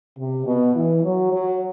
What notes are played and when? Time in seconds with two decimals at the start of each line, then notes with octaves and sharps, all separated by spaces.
0.19 C3
0.47 B2
0.75 E3
1.04 F#3
1.32 F#3